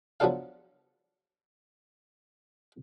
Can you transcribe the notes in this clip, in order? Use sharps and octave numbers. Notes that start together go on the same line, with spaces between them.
F3 F#3 B3 D4 A4 F5